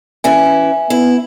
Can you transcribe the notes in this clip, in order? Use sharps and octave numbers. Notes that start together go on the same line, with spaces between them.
E3 C#4 E4 E5 G#5
B3 E4